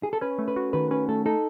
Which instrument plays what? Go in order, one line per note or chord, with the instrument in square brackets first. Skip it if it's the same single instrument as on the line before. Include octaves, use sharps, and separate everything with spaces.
[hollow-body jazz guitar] G#4
A4
[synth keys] C#4 [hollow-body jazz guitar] B4
[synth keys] A3
[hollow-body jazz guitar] B4
[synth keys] F#4
[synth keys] D#3 [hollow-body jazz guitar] B4
[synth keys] C#4 [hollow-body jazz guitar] B4
[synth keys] A3 [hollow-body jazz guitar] A4
[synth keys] D#4 [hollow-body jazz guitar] A4